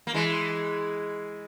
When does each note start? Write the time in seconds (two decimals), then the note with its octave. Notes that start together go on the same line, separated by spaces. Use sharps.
0.07 A#3
0.14 E3 G#3